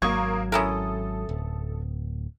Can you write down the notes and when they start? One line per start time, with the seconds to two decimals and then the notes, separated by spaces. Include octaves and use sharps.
0.02 G#1 F#3 A#3 C#6 D#6 G#6
0.52 C#4 E4 A4 A#4 D#6
1.29 D1